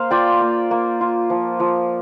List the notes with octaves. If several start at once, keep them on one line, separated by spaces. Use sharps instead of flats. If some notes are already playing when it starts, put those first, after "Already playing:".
Already playing: A#3 C5 F5
F4 D5 G5
A#3
A#3
F4
F3
F3